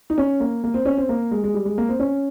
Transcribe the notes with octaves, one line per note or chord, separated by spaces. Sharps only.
D#4
C#4
A#3
A#3
C4
C#4
C4
A#3
G#3
G#3
G3
G#3
A#3
C4
C#4